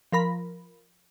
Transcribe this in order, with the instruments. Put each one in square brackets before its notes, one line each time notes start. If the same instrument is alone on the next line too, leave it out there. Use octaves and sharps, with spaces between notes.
[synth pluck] F3 A#4 B5 A#6